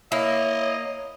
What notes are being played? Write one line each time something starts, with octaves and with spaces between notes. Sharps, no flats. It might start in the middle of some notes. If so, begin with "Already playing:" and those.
A#3 E4 C#5 D#5 E5